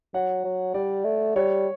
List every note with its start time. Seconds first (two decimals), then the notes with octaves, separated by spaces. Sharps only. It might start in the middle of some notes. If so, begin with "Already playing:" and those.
0.14 F#3 F#5
0.44 F#3
0.74 G3 D5
1.04 A3
1.36 G3 C#5